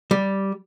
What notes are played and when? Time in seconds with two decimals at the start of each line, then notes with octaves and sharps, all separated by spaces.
0.11 G3